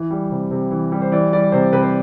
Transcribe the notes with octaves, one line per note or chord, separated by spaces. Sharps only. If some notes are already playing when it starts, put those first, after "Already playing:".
Already playing: E3 E4
G3
C3
C3
E3
G3
C5
E3 D5
G3 D5
C3 C5
C3 B4
C5